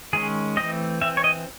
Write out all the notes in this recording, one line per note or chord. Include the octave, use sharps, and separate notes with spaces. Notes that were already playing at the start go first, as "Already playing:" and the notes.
D#3 G#3 C#4 G#4
E3 A3 C4 D#5
E3 C4 E5
C#5
D#5